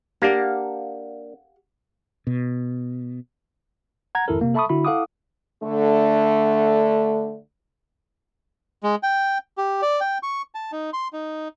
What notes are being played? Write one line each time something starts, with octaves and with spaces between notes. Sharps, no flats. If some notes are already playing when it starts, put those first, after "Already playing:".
A#3 D4 G4 F5 F#5
B2
F#5 A#5 G#6
G#1 F2 E4 A4 A#4
C3 A#3
A4 E5 A5 B5 C#6 D#6
D3 E4 F#4 B5
E4 A4 F5 F#5 D6 D#6
D3 A3
G#3
G5
G4
D5
G5
C#6
A5
D#4
C6
D#4